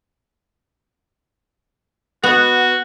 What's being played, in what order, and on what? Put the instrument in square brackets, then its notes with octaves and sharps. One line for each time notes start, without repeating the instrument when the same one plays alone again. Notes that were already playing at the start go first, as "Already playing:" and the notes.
[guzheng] B3 [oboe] F#4